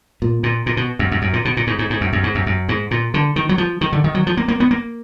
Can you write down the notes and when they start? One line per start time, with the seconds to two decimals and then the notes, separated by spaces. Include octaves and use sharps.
0.22 A#2
0.43 A#2
0.66 A#2
0.77 B2
0.99 F#2
1.12 F#2
1.22 F#2
1.33 A#2
1.45 B2
1.57 A#2
1.67 G#2
1.79 G#2
1.90 G#2
2.01 F#2
2.13 F#2
2.23 G#2
2.35 F#2
2.46 F#2
2.69 G#2
2.91 A#2
3.14 D3
3.36 D#3
3.49 F#3
3.58 F3
3.81 D#3
3.93 D3
4.04 D#3
4.15 F#3
4.27 F3
4.37 A#3
4.48 A#3
4.60 B3
4.71 A#3